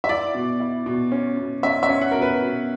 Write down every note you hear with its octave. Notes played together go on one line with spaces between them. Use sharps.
E5
E4 D5
B2
E4
B2
C#4
B2
C#4 E5
E5
C#4
F#5
B2 A#4
B4
B2